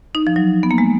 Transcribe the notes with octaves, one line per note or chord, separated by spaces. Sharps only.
D#4
F3
F#3
B3
A#3
G#3